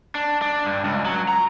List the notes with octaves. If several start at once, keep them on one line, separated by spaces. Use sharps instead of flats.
D4
D4
G2
C#2
F#3
A#5